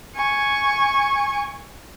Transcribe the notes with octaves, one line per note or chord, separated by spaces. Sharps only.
G#5 C#6